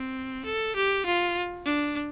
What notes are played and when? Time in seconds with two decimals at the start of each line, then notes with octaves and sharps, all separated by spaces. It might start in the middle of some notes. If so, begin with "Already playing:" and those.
Already playing: C4
0.46 A4
0.76 G4
1.06 F4
1.66 D4